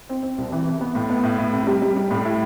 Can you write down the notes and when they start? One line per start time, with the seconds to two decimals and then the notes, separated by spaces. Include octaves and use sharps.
0.09 C4
0.23 C4
0.38 C2
0.52 E3
0.66 C3
0.81 B3
0.95 A2
1.10 B3
1.23 A2
1.38 A2
1.53 C3
1.67 G3
1.82 G3
1.96 G3
2.11 A2
2.25 E4